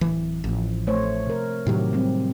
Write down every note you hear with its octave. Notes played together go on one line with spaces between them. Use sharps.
D1 E3
A1 F3
A3 C5 C#5
C3 A#4
A2 C3 D#3 F#3 G4
G3 C4